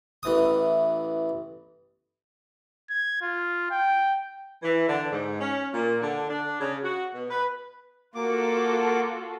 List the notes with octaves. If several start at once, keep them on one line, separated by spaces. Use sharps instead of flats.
A1 E3 D#6
G#6
F4
G5
E3
D3
G#2
C#4
A#2
D3
D4
C#3
F#4
B2
B4
A#3 F4 F#4 A4 D6